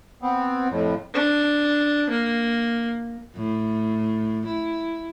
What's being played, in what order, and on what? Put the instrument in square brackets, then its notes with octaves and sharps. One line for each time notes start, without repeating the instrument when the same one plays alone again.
[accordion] B3 C4
F2 A2
[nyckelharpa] D4
A#3
[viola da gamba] A2
E4